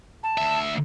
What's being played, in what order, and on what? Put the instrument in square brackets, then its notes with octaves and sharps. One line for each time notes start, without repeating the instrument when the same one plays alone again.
[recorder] A5
[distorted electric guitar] D2 E5